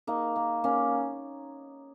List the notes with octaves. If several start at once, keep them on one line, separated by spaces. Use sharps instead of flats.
A#3 D#4
A#3
A#3 C#4